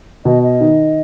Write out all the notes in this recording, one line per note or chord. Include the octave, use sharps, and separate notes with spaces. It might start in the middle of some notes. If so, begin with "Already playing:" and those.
B2 D#5
D#5
D#3